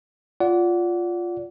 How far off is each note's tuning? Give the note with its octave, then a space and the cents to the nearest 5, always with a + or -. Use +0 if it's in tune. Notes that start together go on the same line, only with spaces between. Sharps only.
F4 +0 D5 -25 F#5 +0